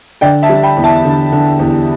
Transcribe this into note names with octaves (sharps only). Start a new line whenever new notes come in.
D3 D5 G5
E5 A5
G3
G5 B5
E2
E5 A5
D3
D3
E2